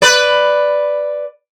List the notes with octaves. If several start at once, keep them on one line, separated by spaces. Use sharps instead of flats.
B4 D5